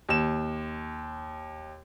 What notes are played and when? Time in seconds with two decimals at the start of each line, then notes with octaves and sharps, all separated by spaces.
0.09 D#2 E7